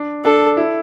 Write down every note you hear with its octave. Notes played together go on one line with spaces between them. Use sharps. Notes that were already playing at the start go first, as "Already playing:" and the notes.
Already playing: D4
D4 A4
E4